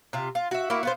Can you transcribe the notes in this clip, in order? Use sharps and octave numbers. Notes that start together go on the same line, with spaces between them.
C3 F4
F4
F#4 E5
A#3 E4 F#4
B3 F4 C5